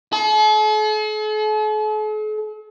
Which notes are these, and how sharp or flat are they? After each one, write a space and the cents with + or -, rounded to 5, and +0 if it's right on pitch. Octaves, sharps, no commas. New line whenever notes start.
A4 -45